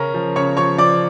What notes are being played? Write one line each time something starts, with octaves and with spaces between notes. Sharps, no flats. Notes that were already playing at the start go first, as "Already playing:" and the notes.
Already playing: C#3 C#4 A#4 A#5
F3
C#3 C#5 C#6
F3 C#5 C#6
F3 D5 D6